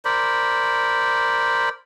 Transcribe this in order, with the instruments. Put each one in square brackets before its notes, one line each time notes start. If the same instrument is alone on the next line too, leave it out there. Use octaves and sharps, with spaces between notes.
[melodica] A#4 C5 D5 B5